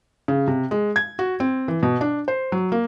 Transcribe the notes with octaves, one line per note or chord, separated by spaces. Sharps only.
C#3
C3
G#3
G#6
F#4
C4
E3
B2
D4
C5
F#3
A#3